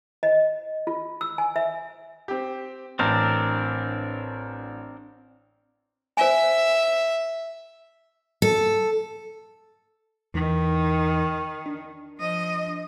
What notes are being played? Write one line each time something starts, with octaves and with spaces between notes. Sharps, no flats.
D#5
F4
E6
G#5
E5
C4 G4
A1 C4 D4 A#4
C5 E5 G#5
A4
E2 D#3 E3 D#4
D4
F3 D#5